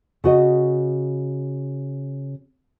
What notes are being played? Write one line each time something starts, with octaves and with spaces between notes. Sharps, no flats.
C#3 F#4 D#5